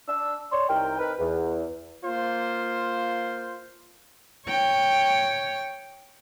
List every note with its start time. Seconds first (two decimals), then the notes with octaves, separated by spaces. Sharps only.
0.08 D4 E6
0.52 C#5 D5 C6
0.69 C2 D#4 A#4 G5
0.99 C4 D#4 A#4 B4
1.19 E2
2.03 A#3 F4 C5
4.48 C#5 G5